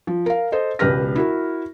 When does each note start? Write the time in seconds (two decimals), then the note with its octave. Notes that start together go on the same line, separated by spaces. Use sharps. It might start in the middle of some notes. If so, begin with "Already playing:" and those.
0.07 F3
0.26 A#4 F5
0.52 A4 C5 D#5
0.79 E1 C#2 G4 B4 F6 A#6
1.16 E4 F#4 A#4